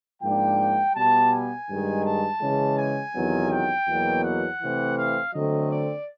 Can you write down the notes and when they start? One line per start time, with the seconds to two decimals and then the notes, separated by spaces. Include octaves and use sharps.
0.23 G#2 F3 A#3 D4 G5
0.95 B2 G3 B3 A5
1.32 G#5
1.69 G2 D#3 G#3
2.05 A5
2.41 C#3 E3 G#3 C#4
2.78 G#5
3.15 E2 C3 D#3 F#3 B3
3.51 G5
3.88 E2 B2 F#3 A#3
4.24 F#5
4.61 C3 E3 A3 C4
4.97 F5
5.33 D3 F#3 A3 C4 D#5
5.71 D5